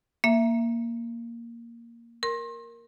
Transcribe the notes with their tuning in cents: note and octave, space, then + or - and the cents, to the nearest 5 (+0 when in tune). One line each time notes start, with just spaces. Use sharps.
A#3 +0 E5 +20
A#4 +0 C6 +35